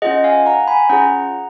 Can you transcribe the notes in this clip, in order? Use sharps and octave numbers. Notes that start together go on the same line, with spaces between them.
C#4 F4 G#4 D#5 F#5
F5 G#5
F#5 A#5
G#5 B5
C#4 F4 G#4 F#5 A#5